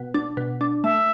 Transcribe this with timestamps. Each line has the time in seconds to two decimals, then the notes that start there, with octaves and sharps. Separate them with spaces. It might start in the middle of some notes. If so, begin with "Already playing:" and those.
Already playing: B2
0.14 D4
0.37 B2
0.61 D4
0.84 A3 E5